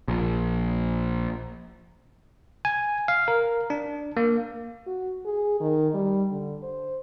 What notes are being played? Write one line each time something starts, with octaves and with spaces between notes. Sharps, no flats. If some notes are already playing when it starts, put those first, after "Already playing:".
A#1
G#5
F5
A#4
D4
A#3
F#4
G#4
D#3
G3
D3
C5